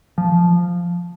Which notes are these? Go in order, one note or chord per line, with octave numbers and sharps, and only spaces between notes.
F3